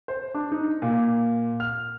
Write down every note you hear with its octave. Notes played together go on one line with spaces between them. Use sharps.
C5
D4
D#4
A#2
F6